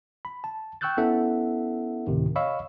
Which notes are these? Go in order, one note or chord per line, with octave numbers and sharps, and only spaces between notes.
B5
A5
G5 C#6 E6 F#6 G6 A6
B3 C#4 E4 A4 E5 F#5
D2 A2 C3 D#3
C#5 D#5 F5 B5 C#6 E6